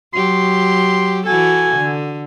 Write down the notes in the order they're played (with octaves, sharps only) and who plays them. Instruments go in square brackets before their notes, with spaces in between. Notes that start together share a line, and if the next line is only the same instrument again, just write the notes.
[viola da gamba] F#3 G4 [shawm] C6
[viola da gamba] E3 F#4 A4 [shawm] G#5
[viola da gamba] D3